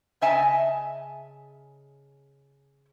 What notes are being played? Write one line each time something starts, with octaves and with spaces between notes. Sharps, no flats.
C#3 D#5 E5 G#5 A5